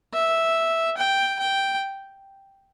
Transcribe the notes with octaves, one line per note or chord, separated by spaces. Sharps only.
E5
G5
G5